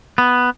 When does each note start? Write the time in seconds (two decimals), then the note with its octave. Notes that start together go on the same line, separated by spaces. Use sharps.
0.18 B3